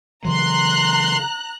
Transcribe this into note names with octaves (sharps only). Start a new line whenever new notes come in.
C#3 E3 F#3 A#5 C6 F#6